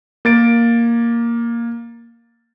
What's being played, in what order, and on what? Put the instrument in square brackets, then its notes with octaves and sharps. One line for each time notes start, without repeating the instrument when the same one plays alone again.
[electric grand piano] A#3 A6 D7